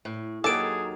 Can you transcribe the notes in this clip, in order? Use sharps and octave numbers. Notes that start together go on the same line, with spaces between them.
A2
D#2 D#3 F#3 G#4 A4 D6 D7